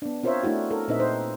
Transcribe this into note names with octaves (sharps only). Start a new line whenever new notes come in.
B3 D4
C4 F4 A#4 C5 C#5 E5
A3 D4 E4 F#4
A4 A#4
A#2 C4 D#4 B4 D#5 E5
D#4 C5